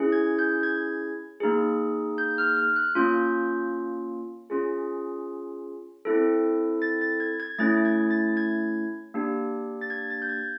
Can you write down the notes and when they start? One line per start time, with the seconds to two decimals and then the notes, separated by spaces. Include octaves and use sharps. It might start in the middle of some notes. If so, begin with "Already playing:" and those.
Already playing: C#4 E4 G#4
0.12 G#6
0.39 G6
0.63 G#6
1.40 A#3 D#4 G#4
2.18 G6
2.38 F6
2.57 F6
2.76 F#6
2.95 A#3 C#4 F4 G6
4.50 C#4 F4 G#4
6.05 C4 E4 A4
6.82 A6
7.01 A6
7.20 G#6
7.40 G#6
7.59 A3 C#4 E4 A6
7.85 G#6
8.11 A6
8.37 G#6
9.14 A#3 D4 G4
9.81 A6
9.90 G#6
10.10 A6
10.22 G6
10.29 G#6